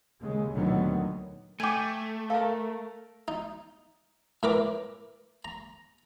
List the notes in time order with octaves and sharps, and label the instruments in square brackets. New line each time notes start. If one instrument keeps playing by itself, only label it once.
[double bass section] D#2 C#3 G#3
D2 A#2 D3 D#3 F#3 B3
[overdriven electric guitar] A3 [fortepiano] G5 G#5 [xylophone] D6 D#7
[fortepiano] A4 A#4 [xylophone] F5
[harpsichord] D#4
A2 A#4 B4 A#5 D6
A#5